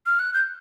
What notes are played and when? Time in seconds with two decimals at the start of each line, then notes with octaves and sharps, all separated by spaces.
0.06 F6
0.19 F#6
0.34 G6